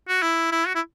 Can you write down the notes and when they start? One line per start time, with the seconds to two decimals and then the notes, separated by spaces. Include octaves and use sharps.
0.08 F#4
0.22 E4
0.52 E4
0.67 F#4
0.75 E4